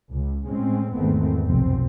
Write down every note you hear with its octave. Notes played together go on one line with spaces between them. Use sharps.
C#2
A2 G#3 C4 C#4
G#1 E2 D#3 A3 B3 C4
F1 B1 F2 C4